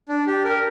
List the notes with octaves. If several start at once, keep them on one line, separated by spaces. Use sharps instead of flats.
D4
G4
A#4